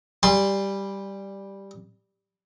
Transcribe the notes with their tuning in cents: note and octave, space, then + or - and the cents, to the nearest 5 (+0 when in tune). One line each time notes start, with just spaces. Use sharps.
G3 +0 G#5 -45 C6 +0